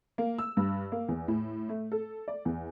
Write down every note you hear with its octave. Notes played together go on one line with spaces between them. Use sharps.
A#3
E6
G2
A#3
E2
A2
A3
A4
D5
E2